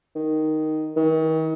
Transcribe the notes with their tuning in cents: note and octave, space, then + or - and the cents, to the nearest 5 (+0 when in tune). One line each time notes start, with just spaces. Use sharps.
D#3 +0
D#3 +40